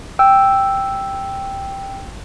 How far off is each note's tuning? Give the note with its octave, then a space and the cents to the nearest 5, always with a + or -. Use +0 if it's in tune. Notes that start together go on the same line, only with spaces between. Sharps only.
G5 +0 E6 +0